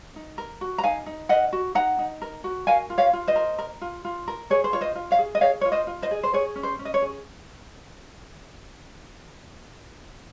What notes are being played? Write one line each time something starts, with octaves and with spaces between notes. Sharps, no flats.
D#4
A#4
F#4
A#5
D#4 F5 G#5
D#4
A#4 D#5 F#5
F#4
D#4 F#5 A#5
D#4
A#4
F#4
A#4 F5 G#5
F4
C#5 F5
F4
C5 D#5
A#4
A#4
F4
F4
A#4
G#4 C#5
C5
F4 C#5
C5 D#5
F4
C#5 F5
G#4
D#5
G#4 C#5 F5
F4 C#5
C5 D#5
F4
C5 D#5
G#4
C5
G#4 C#5
C#4
C5
C#4
D#5
C#5
G#4